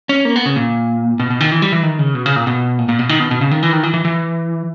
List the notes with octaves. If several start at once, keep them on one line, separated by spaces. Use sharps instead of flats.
C#4
A#3
B3
C#3
A#2
B2
B2
D#3
E3
G3
E3
D#3
C#3
B2
C#3
A#2
B2
A#2
A#2
B2
D#3
B2
B2
C#3
D#3
E3
D#3
E3
E3
E3